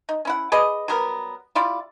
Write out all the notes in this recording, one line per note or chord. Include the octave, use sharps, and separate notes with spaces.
D#4
C#4 E4 F#5
G#4 B4 D5 D#5
F#3 G3 B3 A#4
G3 E4 F4 D5